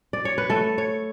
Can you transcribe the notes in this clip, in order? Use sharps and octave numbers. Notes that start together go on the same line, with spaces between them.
D5
C#5
B4
A3 A4
C#5